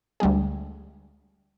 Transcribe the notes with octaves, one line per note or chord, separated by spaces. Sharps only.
D2 G3 G#3 G#4